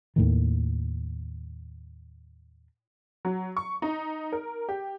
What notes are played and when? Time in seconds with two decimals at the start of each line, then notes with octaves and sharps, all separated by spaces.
0.16 D#2 A2 D#3
3.25 F#3
3.57 C#6
3.82 D#4
4.32 A#4
4.69 G4